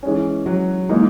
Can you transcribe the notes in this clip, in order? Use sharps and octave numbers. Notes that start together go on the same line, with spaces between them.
E3 G#3 C#4
F#3 F#4
E3 G#3 A#3 D#4